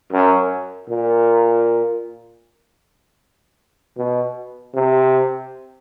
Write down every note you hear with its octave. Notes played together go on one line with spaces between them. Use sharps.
F#2
A#2
B2
C3